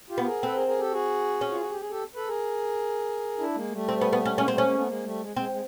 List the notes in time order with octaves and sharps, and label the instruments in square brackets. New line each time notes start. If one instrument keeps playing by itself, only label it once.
[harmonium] F4 G4
[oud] B3
[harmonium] G#4 A#4
[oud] C4 [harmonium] A4 B4
[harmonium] G#4 A#4
G#4 A#4
G4 A4
F#4 G#4
[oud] C#4
[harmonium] F4
F#4
G4
G#4
G4 A4
A4 B4
G#4 A#4
D4 E4
G#3 A#3
G3 A3
[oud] C4
B3
B3
C#4
[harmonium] G#3 A#3 [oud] C#4
[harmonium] G3 A3 [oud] C4
[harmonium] G#3 A#3 [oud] C#4
[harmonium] A3 B3
G#3 A#3
G3 A3
G#3
[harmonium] G#3 [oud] C4
[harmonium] G#3